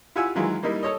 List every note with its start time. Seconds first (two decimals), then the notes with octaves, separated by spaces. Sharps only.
0.16 E4 F4 G4 F#5 G#5 E6
0.35 D#3 E3 F#3 G#3 E4 F4
0.63 G3 A#3 D#4 E4
0.83 A4 C#5 D#5